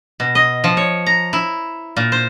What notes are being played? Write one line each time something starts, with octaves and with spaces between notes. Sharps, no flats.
B2
D#5
F3
C#5
A#5
E4
A#2
C5